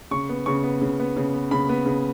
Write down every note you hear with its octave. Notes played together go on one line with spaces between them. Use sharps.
C#3 C#6
B3
C#3 C#6
B3
C#3
B3
C#3
B3
C#3 B5
B3
C#3